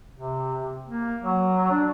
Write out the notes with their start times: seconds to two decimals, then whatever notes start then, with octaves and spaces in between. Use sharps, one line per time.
0.14 C3
0.86 A#3
1.22 F#3
1.71 D4